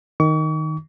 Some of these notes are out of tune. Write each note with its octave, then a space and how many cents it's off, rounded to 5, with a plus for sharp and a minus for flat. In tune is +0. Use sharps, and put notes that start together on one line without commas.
D#3 +0 C#6 +40